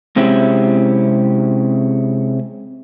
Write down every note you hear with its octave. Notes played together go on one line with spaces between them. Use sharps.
C3 G#3 C4 C#4 E4 G4